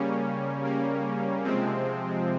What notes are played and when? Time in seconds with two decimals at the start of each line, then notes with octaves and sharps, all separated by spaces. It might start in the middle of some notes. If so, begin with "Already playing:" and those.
Already playing: C#3 G3 A#3 C#4
0.64 A#3
1.44 C3 F3 G#3 C4